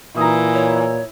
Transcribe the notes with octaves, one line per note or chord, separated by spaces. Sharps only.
A#2 E3 A#5 D#6
C#5